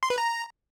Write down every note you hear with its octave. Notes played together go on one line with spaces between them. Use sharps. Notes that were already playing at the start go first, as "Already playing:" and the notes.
C6
B4
A#5